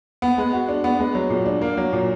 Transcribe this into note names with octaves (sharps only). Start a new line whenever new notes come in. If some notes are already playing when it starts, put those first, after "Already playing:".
B3
G#3
F#4
D4
B3
G#3
F#3
A#2
D4
A#3
F#3
A#2